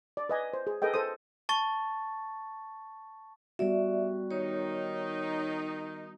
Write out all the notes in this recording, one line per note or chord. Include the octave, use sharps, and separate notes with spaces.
D5
B4 D#5 G#5
C5
G#4
G#4 A4 B4 D#5 G5
A4 C5 D#6
A5 C#6 A6
G3 B3 F#4 D5 E5
D#3 D#4 C#5